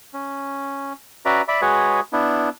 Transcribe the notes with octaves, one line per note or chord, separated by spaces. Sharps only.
C#4
C#4 F#4 B4 D5 E5 A#5
D5 E5 B5
G#3 F#4 G#4 B4 C#5
B3 D4 E4